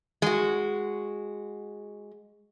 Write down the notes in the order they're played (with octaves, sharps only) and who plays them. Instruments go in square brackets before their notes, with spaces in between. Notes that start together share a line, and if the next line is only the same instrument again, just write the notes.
[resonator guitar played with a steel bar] G#3 F#4